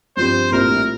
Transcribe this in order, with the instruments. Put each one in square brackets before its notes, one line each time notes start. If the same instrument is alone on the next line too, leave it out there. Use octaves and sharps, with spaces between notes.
[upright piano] G2 F3 C4 G4 [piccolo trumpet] C5
[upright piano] A#1 A2 G3 C4 [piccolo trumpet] A#4